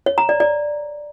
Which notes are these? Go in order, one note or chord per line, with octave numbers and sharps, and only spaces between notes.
C#5
A#5
D5
D5